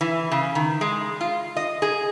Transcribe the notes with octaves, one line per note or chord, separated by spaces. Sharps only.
E3
C#3
D#3
G#3
F4
D#5
G#4